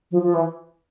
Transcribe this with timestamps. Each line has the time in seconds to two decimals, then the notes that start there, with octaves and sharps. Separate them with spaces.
0.11 F3
0.23 F3
0.34 E3